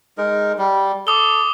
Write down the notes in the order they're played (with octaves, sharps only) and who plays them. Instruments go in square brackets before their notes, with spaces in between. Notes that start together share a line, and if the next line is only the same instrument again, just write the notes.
[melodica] G#3 D#4 A#4
G3
[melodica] A4 [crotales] D6 D#6 G7